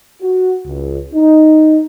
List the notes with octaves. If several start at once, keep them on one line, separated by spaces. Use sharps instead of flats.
F#4
C#2
D#4